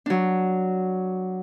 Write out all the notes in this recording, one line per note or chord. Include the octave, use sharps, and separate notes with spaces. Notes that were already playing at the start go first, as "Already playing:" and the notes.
F#3 D4